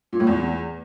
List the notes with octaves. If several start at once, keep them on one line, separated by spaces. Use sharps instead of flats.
A#2
A2
E2